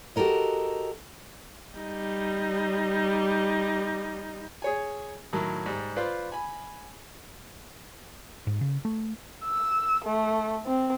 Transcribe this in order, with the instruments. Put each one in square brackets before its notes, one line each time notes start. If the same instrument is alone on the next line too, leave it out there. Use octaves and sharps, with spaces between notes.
[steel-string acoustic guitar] F#4 G4 A4 A#4 D#5
[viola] G3 D#4
[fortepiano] G#4 C#5 G#5
A2 D#3 F#3
G#2 G3
F4 B4 C5 D5
G#5 B5
[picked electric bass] G#2
C#3
A3
[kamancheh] E6
A3
C4